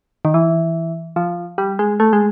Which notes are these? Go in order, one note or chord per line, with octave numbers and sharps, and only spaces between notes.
D#3
E3
F3
G3
G#3
A3
G#3